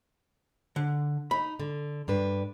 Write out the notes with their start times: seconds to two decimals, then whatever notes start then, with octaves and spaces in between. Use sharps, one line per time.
0.76 D3
1.31 D#4 B5
1.59 D3
2.08 G2 D4 B4